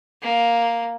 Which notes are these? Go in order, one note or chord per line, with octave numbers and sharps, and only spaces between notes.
A#3